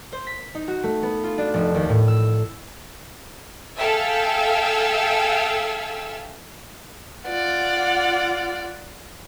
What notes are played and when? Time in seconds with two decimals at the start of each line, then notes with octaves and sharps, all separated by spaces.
0.12 C5
0.27 B6
0.55 D#4
0.68 F#4
0.83 A3
1.03 B3
1.23 F4
1.38 D4
1.54 F1
1.74 D#2
1.89 A2
2.08 E6
3.78 G#4 A4 E5 F5 G5 E6
7.26 F4 D5 F#5